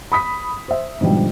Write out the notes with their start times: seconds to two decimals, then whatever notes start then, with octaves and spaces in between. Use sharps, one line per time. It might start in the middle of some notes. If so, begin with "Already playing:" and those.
0.12 B5 D#6 B6
0.68 C5 E5
1.01 G#2 B2 D3 F3 G3